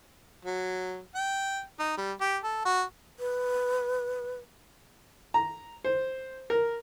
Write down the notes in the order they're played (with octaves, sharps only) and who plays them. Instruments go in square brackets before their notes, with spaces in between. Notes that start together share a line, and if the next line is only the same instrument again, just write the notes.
[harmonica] F#3
G5
D#4
G3
G4
A4
F#4
[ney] B4
[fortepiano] A#5
C5
A#4